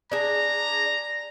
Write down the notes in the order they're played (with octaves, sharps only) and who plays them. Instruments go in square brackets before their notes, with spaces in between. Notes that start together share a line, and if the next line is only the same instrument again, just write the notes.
[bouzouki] D4 G#4 [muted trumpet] A#5